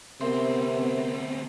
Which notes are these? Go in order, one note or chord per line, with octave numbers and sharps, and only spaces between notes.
D2 C3 B3 C4 A#4 E5 C6